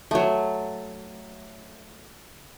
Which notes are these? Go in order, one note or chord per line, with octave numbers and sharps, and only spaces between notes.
F#3 A3